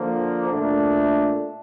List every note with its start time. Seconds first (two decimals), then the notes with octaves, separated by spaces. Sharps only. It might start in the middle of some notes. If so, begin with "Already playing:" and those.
Already playing: D3 F3 A#3
0.48 A#2 A3 D4